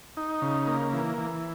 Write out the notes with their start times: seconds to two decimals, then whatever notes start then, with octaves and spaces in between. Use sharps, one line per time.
0.17 D#4
0.42 C#3
0.67 A#3
0.93 E3
1.18 E3